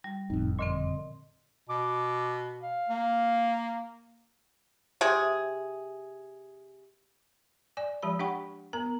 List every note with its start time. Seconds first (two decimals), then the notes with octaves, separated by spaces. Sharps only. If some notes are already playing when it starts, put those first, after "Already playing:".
0.04 G3
0.30 F#1 F2 A2 C4 D#4
0.59 A#2 D3 C4 D#5 C6
1.69 B2 D6
2.62 F5
2.89 A#3
5.01 C3 G#4
7.77 D5 G#5
8.03 F3 G#3 G4 A5 B5
8.19 D4 G4 F#5 G5 B5 C#6
8.73 B3 A#4 A#5